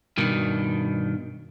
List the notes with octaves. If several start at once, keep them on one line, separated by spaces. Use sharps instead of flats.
G2 B2 D#3